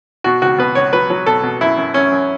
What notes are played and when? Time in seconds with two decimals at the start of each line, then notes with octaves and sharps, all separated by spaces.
0.24 B2 F#4
0.42 C#2 F#4
0.58 B2 B4
0.75 C#2 C#5
0.93 F#3 B4
1.10 F#3
1.26 B2 A4
1.43 B2
1.61 F#2 E4
1.77 F#2
1.94 F#2 C#4
2.11 F#2